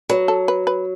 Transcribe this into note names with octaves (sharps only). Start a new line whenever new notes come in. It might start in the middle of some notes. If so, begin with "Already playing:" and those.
F#3 B4
A4
B4
B4